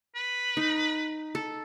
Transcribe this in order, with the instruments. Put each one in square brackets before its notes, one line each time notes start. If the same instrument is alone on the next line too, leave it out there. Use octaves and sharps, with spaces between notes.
[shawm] B4
[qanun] D#4
A4